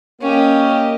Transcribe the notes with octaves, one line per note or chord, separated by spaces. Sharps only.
A#3 C#4 G4 D#5